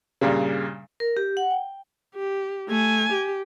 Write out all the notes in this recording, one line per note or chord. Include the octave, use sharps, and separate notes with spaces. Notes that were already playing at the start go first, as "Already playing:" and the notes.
G2 A#2 C#3
A#4
G4
F#5
G5
G4
A3 G#5
G4